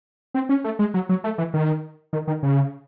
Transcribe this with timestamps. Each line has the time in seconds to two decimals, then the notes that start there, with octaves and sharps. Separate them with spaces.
0.34 C4
0.49 C#4
0.64 A3
0.79 G#3
0.94 F#3
1.09 F#3
1.24 A3
1.38 E3
1.54 D#3
2.13 D#3
2.27 D#3
2.43 C#3